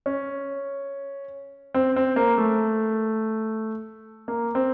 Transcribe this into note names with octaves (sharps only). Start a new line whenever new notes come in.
C#4
C4
C4
A#3
A3
A#3
C4